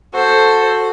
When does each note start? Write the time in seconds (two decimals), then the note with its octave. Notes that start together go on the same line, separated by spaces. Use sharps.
0.13 F#4 A4 C5